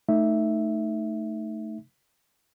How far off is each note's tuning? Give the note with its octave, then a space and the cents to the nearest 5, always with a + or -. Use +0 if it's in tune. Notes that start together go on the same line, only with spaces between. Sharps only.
A3 +0 D#4 +0 E5 +0